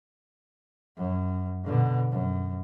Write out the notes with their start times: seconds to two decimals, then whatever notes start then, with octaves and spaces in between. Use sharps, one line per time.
0.97 F#2
1.65 B2 D3
2.11 F#2